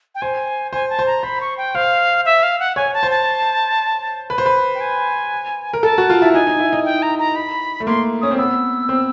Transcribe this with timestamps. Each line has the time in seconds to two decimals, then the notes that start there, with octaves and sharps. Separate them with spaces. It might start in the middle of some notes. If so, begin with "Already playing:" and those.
0.15 G5
0.22 C5 G#5
0.73 C5 G#5
0.90 A5
0.99 C5
1.07 A#5
1.23 C5 B5
1.41 C#6
1.57 G5
1.75 C5 F5
2.25 E5
2.43 F5
2.60 F#5
2.76 C#5 G#5
2.94 A5
3.03 C5
3.11 A5
4.30 B4
4.38 C5
4.46 B4
4.75 G5
4.81 G#5
5.73 A#4
5.83 A4 A5
5.98 F#4
6.10 F4
6.22 E4
6.34 D#4 G#5
6.47 D#4
6.59 E4
6.73 D#4
6.85 G5
7.02 A#5
7.19 A#5
7.36 B5
7.80 A3
7.87 A#3 C6
8.21 C#4 D#6
8.31 C4
8.38 B3 E6
8.89 C4